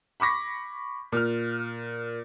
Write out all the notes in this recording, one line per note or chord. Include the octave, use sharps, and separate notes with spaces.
B5 C#6 D6 A#6 B6
A#2 F6